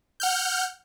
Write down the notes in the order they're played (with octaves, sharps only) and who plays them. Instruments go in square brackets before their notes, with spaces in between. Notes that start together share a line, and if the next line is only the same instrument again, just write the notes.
[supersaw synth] F#5 F6 G6